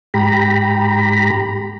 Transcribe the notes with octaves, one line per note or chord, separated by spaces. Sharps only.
G#2 G4 A#5 B5